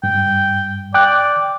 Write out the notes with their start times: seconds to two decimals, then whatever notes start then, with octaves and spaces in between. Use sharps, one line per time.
0.03 G2 G5
0.94 D5 G5 D6 F#6